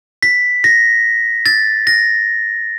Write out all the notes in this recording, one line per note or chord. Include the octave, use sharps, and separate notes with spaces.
B6
A#6
A6
A#6